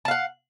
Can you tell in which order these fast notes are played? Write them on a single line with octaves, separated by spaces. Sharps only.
A5 F5 F#5